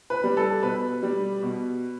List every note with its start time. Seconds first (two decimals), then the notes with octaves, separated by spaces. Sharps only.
0.10 B4
0.24 G3
0.37 A4
0.62 B2 B4
1.03 G3
1.43 B2